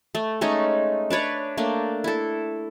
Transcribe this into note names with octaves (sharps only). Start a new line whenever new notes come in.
A3
G#3 A3 C#4 D#4
D4 B4 C#5 D5
A3 A#3 D4
E4 A4